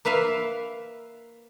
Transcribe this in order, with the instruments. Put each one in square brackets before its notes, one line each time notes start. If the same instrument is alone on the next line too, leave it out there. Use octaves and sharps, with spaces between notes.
[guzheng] A#3 B4 E5 F5